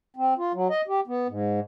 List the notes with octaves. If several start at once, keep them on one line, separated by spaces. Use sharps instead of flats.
C4
F4
F#3
D#5
G4
B3
G#2